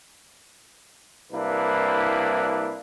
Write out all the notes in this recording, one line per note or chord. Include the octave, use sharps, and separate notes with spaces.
C2 A#3 D4 E4 B4